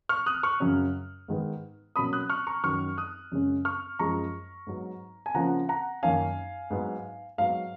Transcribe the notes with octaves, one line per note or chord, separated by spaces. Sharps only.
C#6 F6
D#6 F#6
C#6 F6
F#2 C#3 F#3 C#4
G#2 D#3 G#3 B3
B2 F#3 A#3 C#4 B5 D#6
D#6 F#6
C#6 F6
A#5 C#6
F#2 D#3 F#3 C#6 F6
D#6 F#6
F#2 C#3 G#3 C#4
C#6 F6
F#2 F3 G#3 A#5 C#6
G#2 F#3 B3
G#5
C#3 F3 A#3 C#4 F#5 A#5
F#5 A#5
F#2 D#3 A#3 C#4 F5 G#5
G#2 F#3 B3
G#2 F#3 B3 F5